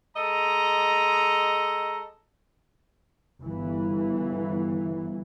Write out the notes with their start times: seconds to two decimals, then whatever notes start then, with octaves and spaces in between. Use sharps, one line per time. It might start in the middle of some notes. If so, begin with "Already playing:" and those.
0.17 G#3 A4 D#5 A#5
3.41 G1 E3